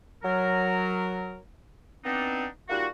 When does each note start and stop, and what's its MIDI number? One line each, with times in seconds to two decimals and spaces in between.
0.23 1.36 54
0.23 1.36 70
2.05 2.45 59
2.05 2.45 60
2.05 2.45 62
2.05 2.45 63
2.69 2.86 55
2.69 2.86 58
2.69 2.86 63
2.69 2.86 65
2.69 2.86 66